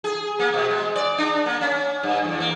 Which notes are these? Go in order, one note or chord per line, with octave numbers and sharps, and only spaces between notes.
G#4
A#3
B2
G#3
D5
D4
A#3
C#4
G2
E2
A#3